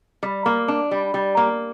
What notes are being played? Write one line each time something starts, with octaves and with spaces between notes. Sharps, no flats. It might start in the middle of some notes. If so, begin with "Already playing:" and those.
G3
A#3
D4
G3
G3
A#3